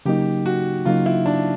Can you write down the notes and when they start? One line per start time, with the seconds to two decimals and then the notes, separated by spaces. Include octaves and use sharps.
0.05 C#3 F#3 A#3 D#4 G4
0.46 F#4
0.85 C#3 F#3 A#3 D#4 F4
1.06 E4
1.26 D4